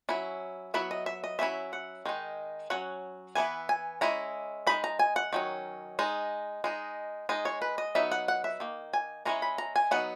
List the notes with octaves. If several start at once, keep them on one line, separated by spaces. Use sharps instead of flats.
F#3 C#4 E4
F#3 B3 E4 E5
D#5
E5
D#5
F#3 C#4 E4 E5
F#5
D#3 G#3 D#4
F#3 C#4 F#5
E3 B3 E4 G#5
G#5
G#3 C#4 E4 A#5
G#3 D#4 B5
A#5
G#5
F#5
D#3 F#3 C#4
G#3 D#4
G#3 D#4
G#3 D#4 D#5
C#5
B4
D#5
F#3 B3 D#4 E5
F#5
F#5
E5
D#3 A#3
G#5
E3 G#3 C#4 E4 A#5
B5
A#5
G#5
F#3 B3 D#4 F#5